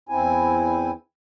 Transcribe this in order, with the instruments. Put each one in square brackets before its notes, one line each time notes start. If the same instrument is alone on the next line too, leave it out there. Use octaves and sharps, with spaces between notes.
[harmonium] E2 C4 E4 G#5